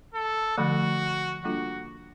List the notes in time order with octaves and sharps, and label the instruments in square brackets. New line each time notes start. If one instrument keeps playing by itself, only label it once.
[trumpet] A4
[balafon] D3 F3 A3 [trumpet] F#4
[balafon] G3 A#3 D4 F4 A4 [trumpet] F#4